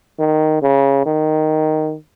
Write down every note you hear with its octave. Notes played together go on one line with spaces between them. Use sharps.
D#3
C#3
D#3